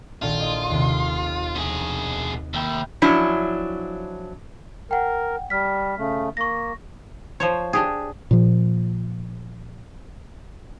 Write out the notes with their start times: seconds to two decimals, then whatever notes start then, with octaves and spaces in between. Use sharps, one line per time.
0.22 A#1 D#3 F4 A4
0.39 E4 D#5 C6
0.70 D#2 C3
1.55 B2 G#4
2.54 D#2 E5 G5 B5
3.02 F3 F#3 C#4 D4 E4
4.91 A#4 F#5 G5
5.50 G3 F6 B6
5.98 C#3 A3
6.37 A#3 C#6 A#6
7.40 F3 C5 C#5
7.73 D4 G4 G#4
8.31 A#2 F3